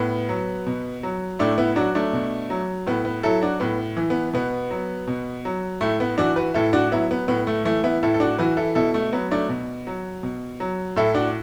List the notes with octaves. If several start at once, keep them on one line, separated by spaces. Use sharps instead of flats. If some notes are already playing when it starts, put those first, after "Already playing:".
Already playing: A2 B3
F#3
B2
F#3
A2 A3 D4
B3 E4
F#3 D4 F#4
A3 D4
B2
F#3
A2 B3
B3
F#3 E4 A4
D4 F#4
A2 B3
E3
B3
B2 B3
F#3
B2
F#3
A2 A3
B3
E3 D4 F#4
F#4 B4
A2 E4 A4
D4 F#4
F#3 B3 E4
B3
A2 B3
A3
E3 A3
B3 E4
A2 E4 A4
A4
D4 F#4
E3 F#4 B4
E4 A4
B2 E4 A4
A3
F#3 B3
A3 D4
B2
F#3
B2
F#3
A2 E4 A4
D4 F#4